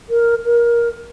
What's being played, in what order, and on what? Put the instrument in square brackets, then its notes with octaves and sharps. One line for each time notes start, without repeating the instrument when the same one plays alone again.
[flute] A#4
A#4